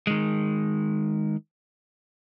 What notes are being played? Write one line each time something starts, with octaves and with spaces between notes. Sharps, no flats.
D#3 G#3